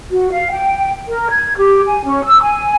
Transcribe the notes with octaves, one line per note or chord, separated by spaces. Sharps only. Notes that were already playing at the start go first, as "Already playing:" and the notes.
F#4
F5
G5
A#4
G#6
G4
G#5
C#4
E6
G#5